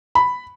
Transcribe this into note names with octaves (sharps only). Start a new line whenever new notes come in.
B5